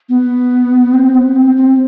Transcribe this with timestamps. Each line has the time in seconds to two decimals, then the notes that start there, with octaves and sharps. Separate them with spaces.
0.09 B3
0.94 C4
1.15 B3
1.36 C4
1.57 C4